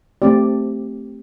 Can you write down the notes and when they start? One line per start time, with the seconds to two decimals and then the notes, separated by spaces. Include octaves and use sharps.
0.22 A3 C4 G4 D5